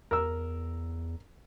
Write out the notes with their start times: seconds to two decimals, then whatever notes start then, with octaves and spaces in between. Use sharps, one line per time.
0.11 E2 A#4 E6